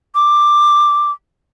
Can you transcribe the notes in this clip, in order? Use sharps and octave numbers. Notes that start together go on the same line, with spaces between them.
D6